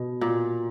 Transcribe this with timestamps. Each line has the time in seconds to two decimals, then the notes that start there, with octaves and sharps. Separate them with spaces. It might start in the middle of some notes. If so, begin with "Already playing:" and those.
Already playing: B2
0.21 A#2